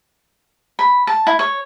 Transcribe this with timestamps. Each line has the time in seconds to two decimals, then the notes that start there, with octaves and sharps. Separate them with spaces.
0.79 B5
1.07 A5
1.27 E4
1.39 C#5